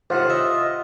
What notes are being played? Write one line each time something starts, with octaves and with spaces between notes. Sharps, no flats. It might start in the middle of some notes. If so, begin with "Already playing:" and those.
D#2 A2 C3 F4 C5 F#5
D#5 E5